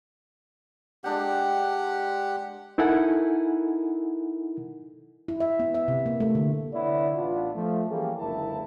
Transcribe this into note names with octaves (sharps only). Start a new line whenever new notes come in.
G#3 D4 G4 F#5 G5
D#4 E4 A4 A#4 F#5 G#5
E4
E5
B3
E5
C3
A#3
A3
D3
D3 B3 E4 C#5 D5
A1 B3 D4 F4
F3 A3
E3 G3 A#3 C#4 G#4 A4
F#1 C#2 D3 E4 A#4 A5